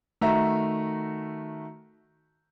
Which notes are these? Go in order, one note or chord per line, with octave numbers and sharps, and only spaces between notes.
D#3 A3 F#4 E5 A#5